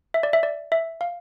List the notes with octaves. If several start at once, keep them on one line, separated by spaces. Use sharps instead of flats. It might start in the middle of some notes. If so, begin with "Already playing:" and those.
E5
D5
E5
D5
E5
F5